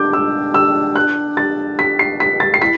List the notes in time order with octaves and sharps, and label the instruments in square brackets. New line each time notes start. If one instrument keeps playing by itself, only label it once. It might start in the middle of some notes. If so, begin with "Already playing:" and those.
Already playing: [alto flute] D4 [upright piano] D6 G6
[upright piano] E6
E6
F#6
A6
B6
C7
B6
A6
C7
[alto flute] E4 [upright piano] B6